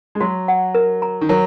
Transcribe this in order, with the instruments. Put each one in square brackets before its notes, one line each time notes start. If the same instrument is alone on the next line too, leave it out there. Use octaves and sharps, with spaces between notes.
[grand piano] G#3
[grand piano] F#3 [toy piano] F#4
[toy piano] F#5
A#4
A#5
[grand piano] D#3
[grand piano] F#3 [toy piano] A#4